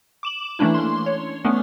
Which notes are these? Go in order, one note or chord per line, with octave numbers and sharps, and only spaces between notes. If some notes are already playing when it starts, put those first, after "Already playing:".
D6 E7 F#7
E3 A3 A#3 C#4 D4 E4
C6
C#5
A3 B3 C#4 D4